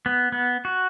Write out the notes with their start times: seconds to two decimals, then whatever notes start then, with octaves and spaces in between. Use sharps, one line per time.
0.06 B3
0.32 B3
0.65 F#4